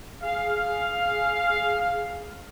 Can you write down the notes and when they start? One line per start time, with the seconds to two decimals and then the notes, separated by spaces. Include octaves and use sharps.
0.23 G#4 F5